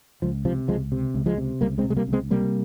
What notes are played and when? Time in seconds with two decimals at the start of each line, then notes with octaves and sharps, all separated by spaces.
0.22 C#2 F3
0.45 C3 F3
0.68 C#2 F3 G#3
0.92 C3
1.14 C#2
1.26 F3 G#3
1.38 C3
1.61 C#2 G3 A#3
1.78 G#3 C4
1.84 C3
1.90 G#3
1.96 G3 A#3
2.08 C#2
2.13 G#3 C4
2.30 C3 G3 A#3